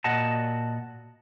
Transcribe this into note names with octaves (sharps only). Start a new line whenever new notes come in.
A#2 F#4 D#5 F#5 A5